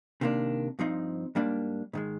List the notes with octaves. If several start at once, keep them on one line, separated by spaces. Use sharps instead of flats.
C3 D#3 A#3 D4
G2 F3 C4 D#4
G#2 G3 A#3 D4
G#2 D#3 G#3